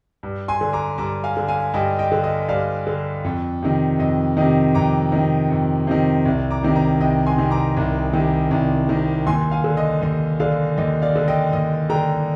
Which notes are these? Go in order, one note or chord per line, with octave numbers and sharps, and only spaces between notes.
G2
G#5 C6
D3
A#5 D6
G2 A#5 D6
F5 G#5
D3
F5 G#5
G2 D#5 G5
D#5 G5
D3
D#5
G2 D5 F5
D3
F2
C3 D#3
F2 D#5
C3 D#3 D#5
F2 A#5 D6
C3 D#3
F2
C3 D#3
C2
A#5 D6
C3 D#3
G5 A#5
C2 D#5 G5
G#5 C6
C3 D#3
A#5 D6
C2
C3 D#3
C2
C3 D#3
D#2 G#5 C6
F5 G#5
D3
D#5
D#2 D#5
D3 D5 F5
D#2 D#5
D5 F5
D3
D#5 G5
D#2 D#5
D3 G5 A#5